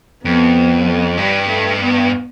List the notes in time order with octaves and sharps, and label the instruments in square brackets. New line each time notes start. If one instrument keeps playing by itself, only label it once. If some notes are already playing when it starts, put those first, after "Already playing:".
[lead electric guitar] F2 [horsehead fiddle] B3
[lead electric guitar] G2 [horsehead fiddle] G3
[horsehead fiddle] A3
B3